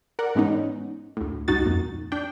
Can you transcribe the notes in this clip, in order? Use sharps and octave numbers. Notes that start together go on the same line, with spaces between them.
A#4 D5 F#5
G#2 E3 G#3 B3 C#4 D#4
D2 A2
C#2 G2 D#4 F#4 A6
F2 A#2
D4 G5